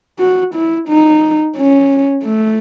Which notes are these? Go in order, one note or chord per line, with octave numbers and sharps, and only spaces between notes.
F#4
E4
D#4
C#4
A3